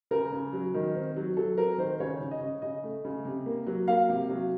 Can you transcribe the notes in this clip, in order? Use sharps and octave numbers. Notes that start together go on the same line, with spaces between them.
C#3 A#4
C#3
F#3
D#3
C4
F#3
F#3 A4
C4 A#4
D#3 C5
C#3 C#5
C#3
D#5
C#3
C#3 D#5
A3
C#3
C3
A#3
F#3
A#3 F5
C3
F#3